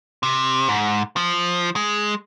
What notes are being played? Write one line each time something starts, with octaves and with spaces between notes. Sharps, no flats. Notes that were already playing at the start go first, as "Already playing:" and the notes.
C3
G#2
F3
G#3